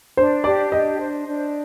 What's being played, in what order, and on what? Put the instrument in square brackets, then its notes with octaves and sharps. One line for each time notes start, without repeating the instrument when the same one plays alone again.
[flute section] D4 [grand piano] C5
[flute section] G4 [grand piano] D5
[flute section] D4 [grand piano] D#5
[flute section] C5
D4